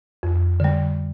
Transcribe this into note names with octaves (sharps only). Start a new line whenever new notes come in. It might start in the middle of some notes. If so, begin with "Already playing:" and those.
F2
D3 G3